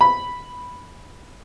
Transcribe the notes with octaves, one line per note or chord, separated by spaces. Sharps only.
B5